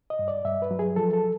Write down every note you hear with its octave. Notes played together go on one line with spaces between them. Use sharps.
D#5
G2
D5
G2 E5
B4
F#3
G#4
F3 A4
A4